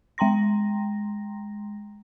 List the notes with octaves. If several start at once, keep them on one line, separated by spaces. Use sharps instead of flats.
G#3 G5 A#5 C6 A#6